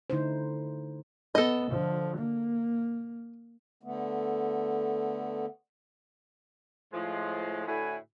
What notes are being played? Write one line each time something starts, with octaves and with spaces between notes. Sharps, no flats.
D3 A3 D#4 E4 C5
B3 A4 D#5
D3 F3
A#3
D3 A3 B3
A2 F3 G#3
A2 D3 E4 F#4 B4 G#5